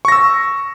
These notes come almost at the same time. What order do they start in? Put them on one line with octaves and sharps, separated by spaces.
C#6 A#6 E6